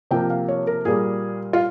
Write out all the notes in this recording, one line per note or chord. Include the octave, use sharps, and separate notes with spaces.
C3 F3 A#3 G5
F5
C#5
A#4
A#2 G3 A#3 G#4
F4